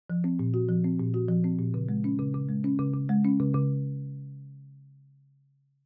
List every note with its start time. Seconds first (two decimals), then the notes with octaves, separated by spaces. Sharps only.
0.10 F3
0.24 C4
0.39 A#2
0.54 F#4
0.69 F3
0.84 C4
0.99 A#2
1.14 F#4
1.29 F3
1.44 C4
1.59 A#2
1.74 C#3
1.89 G#3
2.04 C#4
2.19 C#3
2.34 C#3
2.49 G#3
2.64 C#4
2.79 C#3
2.94 C#3
3.09 G#3
3.24 C#4
3.40 C#3
3.54 C#3